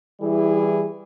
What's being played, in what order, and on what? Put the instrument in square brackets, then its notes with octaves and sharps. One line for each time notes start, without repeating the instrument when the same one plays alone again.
[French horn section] E3 G3 E4 G#4